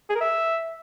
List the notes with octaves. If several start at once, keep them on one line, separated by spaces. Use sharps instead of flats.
G#4
A#4
E5